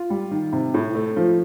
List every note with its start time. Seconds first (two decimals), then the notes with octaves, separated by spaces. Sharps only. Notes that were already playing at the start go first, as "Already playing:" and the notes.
Already playing: F4
0.10 G3
0.31 D#3
0.52 C3
0.74 A2
0.95 A3
1.16 F3